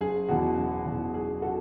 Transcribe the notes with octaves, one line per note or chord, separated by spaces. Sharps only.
F#1 G#4
E2 B2 F#4
F#1
E2 B2
F#1 G#4
B2 F#4 A4